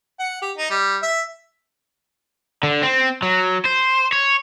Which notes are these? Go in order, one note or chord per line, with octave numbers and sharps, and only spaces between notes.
F#5
G4
D#4
G3
E5
D3
C4
F#3
C5
C#5